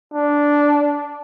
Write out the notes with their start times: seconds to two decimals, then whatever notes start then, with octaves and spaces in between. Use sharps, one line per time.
0.14 D4